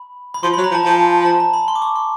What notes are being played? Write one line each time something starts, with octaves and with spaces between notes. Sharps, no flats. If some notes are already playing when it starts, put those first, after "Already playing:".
Already playing: B5
B5
F3 C6
F#3 B5
A#5
F3
A5
F3 G#5
A5
A#5
B5
C6
D6
C#6
C6